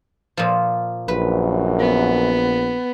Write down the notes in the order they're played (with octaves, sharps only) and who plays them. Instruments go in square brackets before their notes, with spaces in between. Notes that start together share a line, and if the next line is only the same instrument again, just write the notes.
[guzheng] A#2 F3
[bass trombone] A#1 [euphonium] F#2 [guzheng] B4
[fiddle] B3